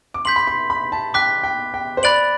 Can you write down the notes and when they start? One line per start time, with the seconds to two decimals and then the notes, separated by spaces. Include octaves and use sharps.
0.14 D6
0.25 C6 G6 B6 F#7
0.36 B5
0.47 C6
0.70 B5
0.92 A5
1.14 G5 D6 F#6 B6
1.43 G5
1.74 G5
1.97 C5
2.03 D5 B5 F#6 A6 D7 F#7